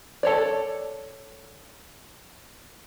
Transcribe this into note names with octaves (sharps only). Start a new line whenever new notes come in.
A4 C#5 D5